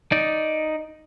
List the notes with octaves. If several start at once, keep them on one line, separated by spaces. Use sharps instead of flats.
D#4 D5